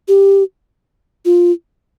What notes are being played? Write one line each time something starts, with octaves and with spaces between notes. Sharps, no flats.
G4
F4